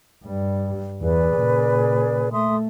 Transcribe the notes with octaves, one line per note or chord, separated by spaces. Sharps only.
G2 G3
E2 G#4 B4 D5
A#2 C#3
A3 E5 C6 D#6